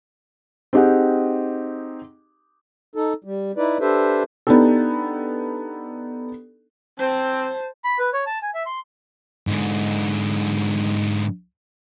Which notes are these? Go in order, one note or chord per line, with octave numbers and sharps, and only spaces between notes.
C4 D#4 G4 G#4 F#5
D#4 A4
G3
D#4 E4 B4 D5
D4 G4 A4 B4 C5 E5
B3 D4 D#4 G4 A4
C4 C5 A5
B5
B4
C#5
A5
G#5
E5
C6
G#2 D3